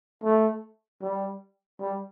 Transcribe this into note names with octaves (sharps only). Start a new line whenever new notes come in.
A3
G3
G3